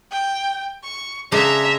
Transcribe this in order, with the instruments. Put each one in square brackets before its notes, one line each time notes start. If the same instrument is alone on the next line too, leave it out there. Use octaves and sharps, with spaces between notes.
[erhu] G5
C#6
[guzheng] C#3 G#3 D4 [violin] E5 [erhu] A#5